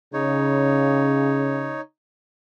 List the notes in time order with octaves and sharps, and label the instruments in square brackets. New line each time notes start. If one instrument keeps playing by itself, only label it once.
[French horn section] C#3 [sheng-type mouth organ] D#4 C#5